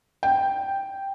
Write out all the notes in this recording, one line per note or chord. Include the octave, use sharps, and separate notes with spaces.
G5